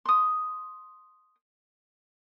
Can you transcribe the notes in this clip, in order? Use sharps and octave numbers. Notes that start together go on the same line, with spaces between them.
C6 D#6